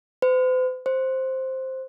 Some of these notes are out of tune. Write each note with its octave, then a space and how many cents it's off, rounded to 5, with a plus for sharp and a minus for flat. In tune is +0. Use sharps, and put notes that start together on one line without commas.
C5 -45
C5 +5